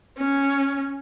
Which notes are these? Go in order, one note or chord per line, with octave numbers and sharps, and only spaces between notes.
C#4